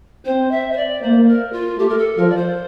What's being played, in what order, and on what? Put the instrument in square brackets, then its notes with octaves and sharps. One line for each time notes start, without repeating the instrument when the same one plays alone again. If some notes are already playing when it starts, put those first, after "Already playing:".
[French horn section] C4 [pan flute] C5
[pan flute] E5
C5
D5
[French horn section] A#3 [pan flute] C5
[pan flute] A#4
F4
[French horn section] A3 [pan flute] G4
[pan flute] A#4
A4
[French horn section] F3 [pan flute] A#4
[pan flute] D5
C5